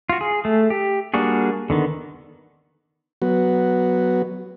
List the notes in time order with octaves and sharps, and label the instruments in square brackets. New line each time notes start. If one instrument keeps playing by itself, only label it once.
[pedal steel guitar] F4 F#4
G#4
A3
G4
G3 A#3 D4 F#4 G#4
D3 D#3 B3
[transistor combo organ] F#3 B3 F#4